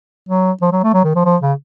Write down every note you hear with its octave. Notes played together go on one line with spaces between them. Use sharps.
F#3
F3
F#3
A3
F#3
D#3
F3
F3
C#3